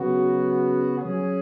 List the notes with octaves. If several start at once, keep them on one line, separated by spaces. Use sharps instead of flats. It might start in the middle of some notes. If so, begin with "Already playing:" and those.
Already playing: C#3 F#3 B3 F#4
F#3 C#4 G#4